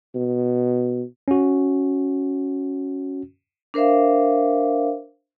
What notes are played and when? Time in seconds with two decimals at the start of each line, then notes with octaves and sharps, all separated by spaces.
0.15 B2
1.28 C#4 F#4
3.74 D4 A#4 C5 E5 F5